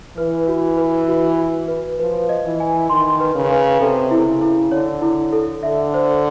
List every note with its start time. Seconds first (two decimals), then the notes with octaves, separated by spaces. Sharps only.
0.17 E3 B4
0.48 F#4
0.77 B4
1.08 F#4
1.38 F#4
1.68 B4
1.99 F3 B4
2.29 D#5
2.45 E3
2.60 G#5
2.90 D#3 C6
3.20 B4
3.35 C#3
3.51 B4
3.81 C3 A4
4.11 E4
4.26 C#3
4.41 E4
4.72 D3 C#5
5.02 E4
5.32 A4
5.63 D3 E5
5.94 C5